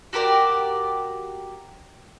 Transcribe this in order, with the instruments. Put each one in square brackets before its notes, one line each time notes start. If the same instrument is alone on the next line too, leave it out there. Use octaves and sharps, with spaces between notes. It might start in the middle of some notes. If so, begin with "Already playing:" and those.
[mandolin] F#4 G4 A#4 D5